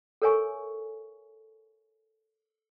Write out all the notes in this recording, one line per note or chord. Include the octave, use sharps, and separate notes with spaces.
A4 A#4 C#5 E5 G#5 C#6